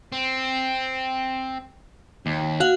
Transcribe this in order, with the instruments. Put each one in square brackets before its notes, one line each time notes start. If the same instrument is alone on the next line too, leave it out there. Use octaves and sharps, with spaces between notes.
[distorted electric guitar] C4
D#2
[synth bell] F#4 F5 F#5